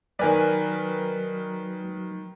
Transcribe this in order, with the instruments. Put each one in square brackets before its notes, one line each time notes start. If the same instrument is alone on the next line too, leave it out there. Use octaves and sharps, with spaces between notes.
[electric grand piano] D#3 A#4 B4 [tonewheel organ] F#3 [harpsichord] D5 G#5